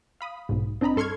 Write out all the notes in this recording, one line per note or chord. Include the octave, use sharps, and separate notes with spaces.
F5 B5 D#6
B1 G#2
C4 D4 D#5 A#5 B5
G2 A4 C6 C#6 F6 G#6